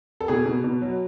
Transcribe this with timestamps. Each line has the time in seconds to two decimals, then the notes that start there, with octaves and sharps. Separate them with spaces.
0.21 A4
0.28 B2 G#4
0.46 B2
0.64 B2
0.81 F#3